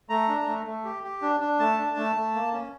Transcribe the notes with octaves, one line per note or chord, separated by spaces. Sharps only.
A3 A#5
D4
A3
A3
G4
G4
D4
D4
A3 A5
D4
A3
A3
A#3
C#4